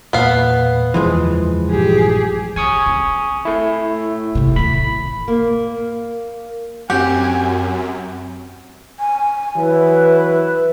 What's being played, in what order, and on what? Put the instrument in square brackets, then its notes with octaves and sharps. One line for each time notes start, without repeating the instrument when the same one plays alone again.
[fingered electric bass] E1 A#2 A#3 [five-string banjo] B3 F5
[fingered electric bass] F#1 E2 [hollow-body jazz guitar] E3 F3 G#3
[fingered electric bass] A#1 G2 [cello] G4 G#4
[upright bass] D#3 [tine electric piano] G#5 C#6 D#6
[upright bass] C4
[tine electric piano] A3 E4
[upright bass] G#1 C3
[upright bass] A2 D#3 [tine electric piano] B5
[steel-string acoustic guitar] A#3
[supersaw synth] F#2 [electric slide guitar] C4 F#4 F#5 [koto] G4 [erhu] G#5
[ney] G#5
[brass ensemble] E3 F#3 E4 [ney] B4